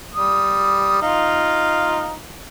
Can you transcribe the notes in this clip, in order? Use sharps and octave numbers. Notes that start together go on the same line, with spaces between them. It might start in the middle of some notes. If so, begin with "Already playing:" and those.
G3 D#6
D#4 F4 F5